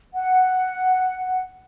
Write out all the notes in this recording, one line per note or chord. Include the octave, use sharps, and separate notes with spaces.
F#5